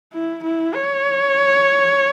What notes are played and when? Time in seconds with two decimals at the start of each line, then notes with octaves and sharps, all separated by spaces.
0.14 E4
0.44 E4
0.75 C#5